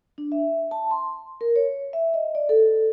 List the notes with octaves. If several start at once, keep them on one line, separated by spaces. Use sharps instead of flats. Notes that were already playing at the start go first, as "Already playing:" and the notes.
D4
E5
A5
C6
A#4
C#5
E5
D#5
D5
A4